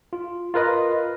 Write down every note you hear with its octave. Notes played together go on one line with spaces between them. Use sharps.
F4
F4 A#4 B4 D#5